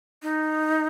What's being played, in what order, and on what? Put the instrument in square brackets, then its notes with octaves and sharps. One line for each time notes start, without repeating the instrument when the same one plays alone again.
[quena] D#4